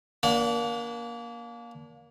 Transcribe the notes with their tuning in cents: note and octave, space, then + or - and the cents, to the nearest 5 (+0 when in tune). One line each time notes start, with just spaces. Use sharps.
A#3 +20 D4 -35 F#5 +0